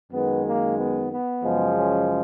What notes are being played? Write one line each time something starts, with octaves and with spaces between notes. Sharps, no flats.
F#2 D#3 G#3 B3
A#3
B3
B3
F#2 C#3 F3 G#3
C#4